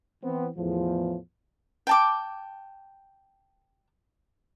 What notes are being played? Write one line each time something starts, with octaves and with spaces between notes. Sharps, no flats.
E3 B3 C4
E2 A2 F3
G5 A5 D6